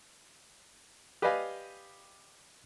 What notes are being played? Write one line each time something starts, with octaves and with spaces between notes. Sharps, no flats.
G4 B4 D5 D#5 F5 G#5